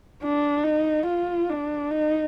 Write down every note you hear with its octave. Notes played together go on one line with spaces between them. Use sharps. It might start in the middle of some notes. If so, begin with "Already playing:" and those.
D4
D#4
F4
D4
D#4